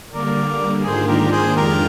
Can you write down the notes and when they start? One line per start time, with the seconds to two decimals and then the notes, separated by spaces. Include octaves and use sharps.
0.11 D3 G3 A#3 A#4 D5
0.84 G#2 D#3 A#3 D4 F4 G#4 C5
1.08 G4 A#4
1.32 G#4 C5
1.56 F2 D#3 G#3 D4 F4 G4 A#4